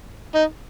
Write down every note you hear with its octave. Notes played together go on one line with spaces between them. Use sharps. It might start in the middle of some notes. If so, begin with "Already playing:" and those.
D#4